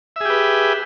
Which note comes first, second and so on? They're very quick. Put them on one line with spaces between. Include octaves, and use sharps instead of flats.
E5 G#4 G4 B4